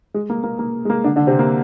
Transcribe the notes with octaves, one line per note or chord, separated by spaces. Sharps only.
G#3
A#3
A#3
A#3
G#3
A#3
D3 D4
D3 D4
C3 C4
A#3